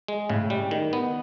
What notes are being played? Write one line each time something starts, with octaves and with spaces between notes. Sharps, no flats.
G#3
A2 C#3
G3
D#3
B3